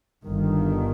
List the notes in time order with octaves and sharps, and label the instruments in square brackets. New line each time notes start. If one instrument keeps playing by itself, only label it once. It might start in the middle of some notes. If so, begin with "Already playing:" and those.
[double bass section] G1 G2 D#3